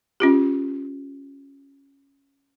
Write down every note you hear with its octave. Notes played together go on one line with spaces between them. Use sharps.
C#4 F4 G4